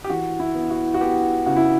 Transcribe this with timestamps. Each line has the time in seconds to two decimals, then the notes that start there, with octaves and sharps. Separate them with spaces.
0.04 G4
0.09 E3 F#4
0.39 E4
0.55 B3
0.70 F#4
0.94 F#4
1.01 B3 G4
1.46 C#3 F#4
1.56 E4